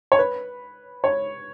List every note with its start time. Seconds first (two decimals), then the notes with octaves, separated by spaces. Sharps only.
0.12 C#5
0.19 B4
1.04 C#5